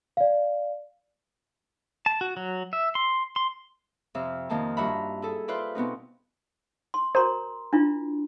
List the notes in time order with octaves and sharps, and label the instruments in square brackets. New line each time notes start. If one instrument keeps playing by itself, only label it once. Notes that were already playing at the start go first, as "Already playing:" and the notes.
[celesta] D5 F5
[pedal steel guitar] A5
F#4
F#3
E5
C6
C6
[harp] F2 C3 E5 F6
F2 D#3 A#3 A5
G2 F4 F#4 E5 A#5 B5
E4 G#4 A4
F4 B4 C5 D5 E5
B2 B3 C4 D#4
[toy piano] C6
[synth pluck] F#4 C5 [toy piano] A#4 A#5 C6
[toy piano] D4 E4 F4